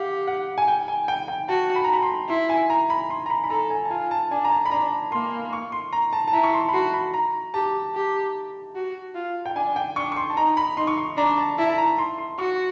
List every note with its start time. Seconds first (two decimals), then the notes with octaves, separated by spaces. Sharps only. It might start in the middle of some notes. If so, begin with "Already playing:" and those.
Already playing: G4 F5 F#5
0.27 F#5
0.58 G#5
0.68 G5
0.88 G#5
1.08 G5
1.28 G5
1.48 F#4 A5
1.75 B5
1.84 A#5
1.93 B5
2.02 C6
2.29 E4 C6
2.50 G#5
2.70 A#5
2.90 B5
3.10 C6
3.26 A#5
3.30 B5
3.44 B5
3.50 A4 A#5
3.70 G#5
3.85 A5
3.91 F4 G#5
4.11 A5
4.31 D4 G#5
4.44 A#5
4.51 A5
4.66 B5
4.71 D4 A#5
5.12 A#3 C6
5.53 C#6
5.72 C6
5.93 A#5
6.13 A5
6.28 A5
6.33 E4 A#5
6.43 C#6
6.53 C6
6.69 B5
6.73 F#4 C6
6.93 B5
7.14 A#5
7.54 G4 A5
7.95 G4
8.75 F#4
9.15 F4
9.46 G5
9.56 D4 G#5
9.76 G5
9.96 D4 C#6
10.12 C#6
10.16 C6
10.30 A5
10.37 D#4 A#5
10.57 B5
10.77 D#4 C6
10.87 C#6
10.98 C6
11.17 D4 A#5
11.38 A5
11.58 E4 A5
11.69 A5
11.78 A#5
11.98 C6
12.18 C6
12.39 F#4 C#6